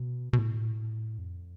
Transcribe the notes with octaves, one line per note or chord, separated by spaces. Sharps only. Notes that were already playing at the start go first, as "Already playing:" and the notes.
Already playing: B2
B2
A2
F2